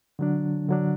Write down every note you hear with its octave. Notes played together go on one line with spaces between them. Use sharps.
D3 F#3 D4
D3 F#3 D4